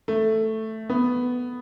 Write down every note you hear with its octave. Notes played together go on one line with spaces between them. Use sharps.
A3
B3